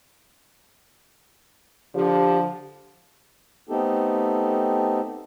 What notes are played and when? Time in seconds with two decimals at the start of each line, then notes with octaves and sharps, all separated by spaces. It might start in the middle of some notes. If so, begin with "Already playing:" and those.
1.95 D3 F3 G4
3.69 A3 B3 C4 D#4 G4 A4